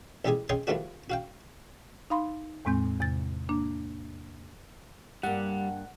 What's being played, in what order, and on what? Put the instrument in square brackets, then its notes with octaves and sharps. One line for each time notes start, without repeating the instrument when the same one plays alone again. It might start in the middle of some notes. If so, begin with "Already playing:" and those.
[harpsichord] A1 G3 G#3 G4 G#4 G#5
C#4 G#4 D#5 G5 G#5 C6
D#3 F3 G3 A3 D4 F#4
F#4 F5 G5
[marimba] D#4 F5 B5 C6
E2 A2 G#3 C4 G6
E2 C3 A6
A#3 D4
[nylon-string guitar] G2 A#3 [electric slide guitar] G3 [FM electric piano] F#5